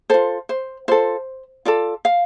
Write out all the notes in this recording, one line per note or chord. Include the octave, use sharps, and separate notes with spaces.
F4 A4 C5
C5
F4 A4 C5
F4 A4 D5
F5